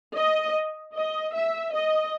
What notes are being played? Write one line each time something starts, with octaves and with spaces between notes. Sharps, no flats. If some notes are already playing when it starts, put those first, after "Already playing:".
D#5
D#5
E5
D#5